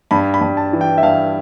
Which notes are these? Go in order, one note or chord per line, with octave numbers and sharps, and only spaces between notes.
G2 B5
B5
G2
A5
E3
G5
E5
G2 F5